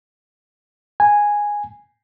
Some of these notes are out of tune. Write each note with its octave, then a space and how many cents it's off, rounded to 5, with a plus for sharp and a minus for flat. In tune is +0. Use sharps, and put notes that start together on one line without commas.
G#5 -5